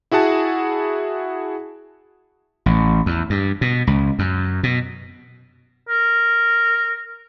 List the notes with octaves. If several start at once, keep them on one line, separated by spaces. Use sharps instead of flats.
E4 F#4 G#4 F#5 A5
A1
E2
G2
B2
C#2
F#2
B2
A#4